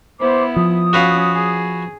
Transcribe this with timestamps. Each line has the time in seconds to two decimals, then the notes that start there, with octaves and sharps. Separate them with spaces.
0.20 B3 E4 C5 D6
0.56 F3 D#6
0.93 C#4 F#4 B4 F5
1.32 G#4